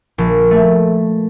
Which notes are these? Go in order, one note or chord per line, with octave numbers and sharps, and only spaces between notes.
A#1
A3